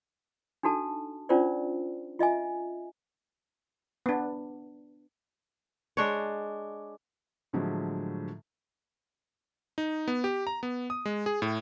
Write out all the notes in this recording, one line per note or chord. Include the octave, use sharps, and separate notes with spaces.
D4 D#4 F#4 A4 A5
C#4 D4 F4 A#4 C5 D5
F4 D#5 E5 G#5
B3 D4
G#3 D4 C#5
A2 D3 F3 F#3 G#3
D#4
B3
G4
A#5
B3
D#6
G#3
G#4
A2